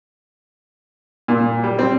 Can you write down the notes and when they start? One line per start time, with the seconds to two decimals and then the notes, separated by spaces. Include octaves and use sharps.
1.28 A#2
1.63 G3
1.79 C4